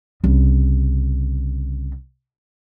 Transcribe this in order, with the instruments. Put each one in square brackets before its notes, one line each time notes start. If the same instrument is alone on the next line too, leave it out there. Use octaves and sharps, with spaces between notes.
[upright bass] C2 C#3